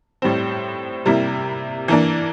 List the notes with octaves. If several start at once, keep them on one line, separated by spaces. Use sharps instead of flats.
A2 G3 C4
C3 G3 A#3 E4
E3 A#3 D4